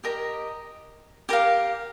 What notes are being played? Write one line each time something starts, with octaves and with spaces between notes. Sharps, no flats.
G4 A#4 D#5 A#5
G4 A#4 F5